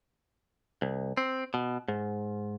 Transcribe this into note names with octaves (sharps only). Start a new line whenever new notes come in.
C2
C4
B2
G#2